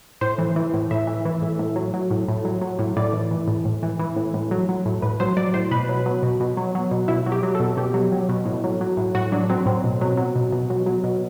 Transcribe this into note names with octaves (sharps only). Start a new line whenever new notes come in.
A2 C5
E3
E3
A2
A2 E5
E3
E3
A2
A2
F#3
F#3
A2
A2
F#3
F#3
A2
A2 D5
E3
E3
A2
A2
E3
E3
A2
A2
F#3
F#3
A2
A2 B4
F#3 C5
F#3 D5
A2 C5
B2 B4
F#3
F#3
B2
B2
F#3
F#3
B2
B2 E4
F#3
G4
F#3
A4
B2
B2 G4
F#3
F#3
B2
A2
F#3
F#3
A2
A2 F#4
F#3 D4
F#3 C4
A2 C4
B2
F#3
F#3
B2
B2
F#3
F#3
B2